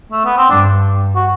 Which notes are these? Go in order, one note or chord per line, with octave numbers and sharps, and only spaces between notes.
A3
B3
C4
G2 D4
F#4